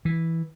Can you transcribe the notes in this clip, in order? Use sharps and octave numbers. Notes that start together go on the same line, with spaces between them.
E3